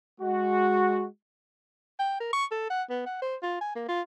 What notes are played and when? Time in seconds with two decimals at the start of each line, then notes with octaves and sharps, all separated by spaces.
0.21 G#3 F#4
1.99 G5
2.20 A#4
2.33 C#6
2.51 A4
2.70 F#5
2.90 B3
3.06 F#5
3.22 C5
3.42 F4
3.61 G#5
3.75 A#3
3.89 F4